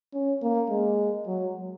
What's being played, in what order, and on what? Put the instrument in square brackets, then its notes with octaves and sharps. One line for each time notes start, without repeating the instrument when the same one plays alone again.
[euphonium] C#4
A#3
G#3
F#3